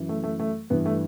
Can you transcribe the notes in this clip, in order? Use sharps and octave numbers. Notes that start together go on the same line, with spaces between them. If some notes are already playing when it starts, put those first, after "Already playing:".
Already playing: F#2 E3
A3
A3
A3
G2 E3 B3
A3